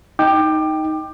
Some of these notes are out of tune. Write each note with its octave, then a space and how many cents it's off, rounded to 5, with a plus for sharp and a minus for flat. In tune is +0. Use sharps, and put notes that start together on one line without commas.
D#4 +5 G5 +0 D6 +25